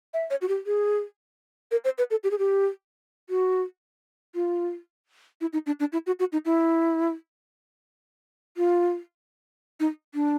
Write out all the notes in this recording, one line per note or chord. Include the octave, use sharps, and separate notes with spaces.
E5
C#5
F#4
G4
G#4
A#4
C5
B4
A4
G4
G#4
G4
F#4
F4
E4
D#4
D4
D4
E4
F#4
F#4
D#4
E4
F4
D#4
D4